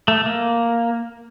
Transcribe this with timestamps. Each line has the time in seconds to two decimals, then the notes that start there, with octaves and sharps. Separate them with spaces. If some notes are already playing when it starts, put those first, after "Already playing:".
0.08 A3
0.26 A#3